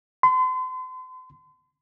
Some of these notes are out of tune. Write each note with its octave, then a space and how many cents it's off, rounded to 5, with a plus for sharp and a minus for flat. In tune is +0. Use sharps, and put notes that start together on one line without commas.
C6 -40